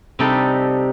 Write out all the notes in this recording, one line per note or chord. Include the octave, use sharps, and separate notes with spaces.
C3 G3 C4 D#4 A4